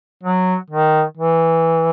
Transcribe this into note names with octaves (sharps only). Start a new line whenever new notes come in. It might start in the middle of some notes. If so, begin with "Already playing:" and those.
F#3
D#3
E3